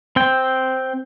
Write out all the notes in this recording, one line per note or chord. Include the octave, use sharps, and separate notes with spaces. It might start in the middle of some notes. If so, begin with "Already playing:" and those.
C4 G5